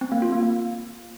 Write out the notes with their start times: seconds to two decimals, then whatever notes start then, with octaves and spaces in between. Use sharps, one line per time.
0.01 C4
0.12 A#3
0.22 F4
0.32 A#3
0.43 A#3